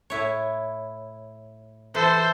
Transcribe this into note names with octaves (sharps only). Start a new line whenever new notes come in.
A2 E4 C#5
E3 A4 C5